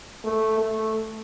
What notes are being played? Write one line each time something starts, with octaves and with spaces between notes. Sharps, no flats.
A3
A3